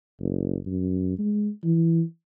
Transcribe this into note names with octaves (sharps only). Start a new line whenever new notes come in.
F#1
F#2
G#3
E3